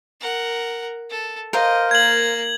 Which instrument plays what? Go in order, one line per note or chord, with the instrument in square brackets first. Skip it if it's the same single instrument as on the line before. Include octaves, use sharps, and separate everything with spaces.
[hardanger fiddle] A#4 F#5
A4
[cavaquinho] A#4 C5 F5 [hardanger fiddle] D#5
[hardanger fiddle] A#3 [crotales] G#6 F#7